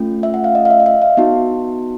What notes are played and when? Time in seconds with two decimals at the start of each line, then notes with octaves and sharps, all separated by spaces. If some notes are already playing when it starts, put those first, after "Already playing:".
Already playing: A3 C#4 F4
0.23 E5
0.34 F#5
0.44 F5
0.55 D#5
0.65 F5
0.70 E5
0.80 D#5
0.86 E5
1.02 F5
1.17 B3 D#4 F#4